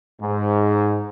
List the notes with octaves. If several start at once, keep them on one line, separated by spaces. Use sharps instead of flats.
G#2